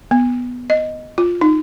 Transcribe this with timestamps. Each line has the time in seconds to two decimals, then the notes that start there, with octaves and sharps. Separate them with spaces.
0.11 B3
0.70 D#5
1.18 F4
1.41 D#4